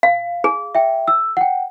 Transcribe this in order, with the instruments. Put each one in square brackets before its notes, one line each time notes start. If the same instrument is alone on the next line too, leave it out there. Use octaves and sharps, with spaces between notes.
[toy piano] F5
G#4
[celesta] E5 G5
E6
F#5 G5